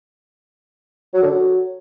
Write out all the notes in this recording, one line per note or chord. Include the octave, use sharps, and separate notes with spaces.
F#3
D3
F#3